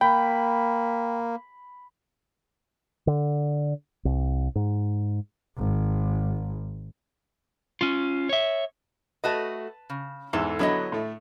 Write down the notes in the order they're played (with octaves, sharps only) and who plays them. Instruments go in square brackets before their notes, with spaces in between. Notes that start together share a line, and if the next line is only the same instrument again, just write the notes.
[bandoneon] A#3 [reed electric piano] G5 [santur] B5
[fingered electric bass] D3
C2
G#2
[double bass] G#1
[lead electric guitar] C#4 F4
C#5 E5
[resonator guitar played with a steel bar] A3 F#4 D#5 [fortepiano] B4 A5
[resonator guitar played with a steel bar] C#3
[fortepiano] E2 G#2 E3 [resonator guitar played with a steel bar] A4
[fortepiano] D3 F#3 B3 [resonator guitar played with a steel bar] E4 C#5 D#5
[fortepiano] A2 A3